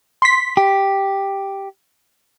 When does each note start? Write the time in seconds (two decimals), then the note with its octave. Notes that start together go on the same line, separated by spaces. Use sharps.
0.22 C6 B6
0.57 G4